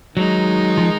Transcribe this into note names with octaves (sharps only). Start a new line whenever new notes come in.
D#3 F#3 G#3 D#4
F3